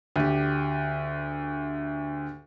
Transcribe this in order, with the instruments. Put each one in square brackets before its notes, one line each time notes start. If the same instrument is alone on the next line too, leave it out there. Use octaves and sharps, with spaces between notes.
[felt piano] D2 G4